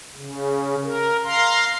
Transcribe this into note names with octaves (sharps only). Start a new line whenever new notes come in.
C#3
A#4
F5 A#5 C6